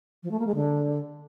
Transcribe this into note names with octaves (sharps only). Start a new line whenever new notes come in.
F3
A3
A#3
G#3
D3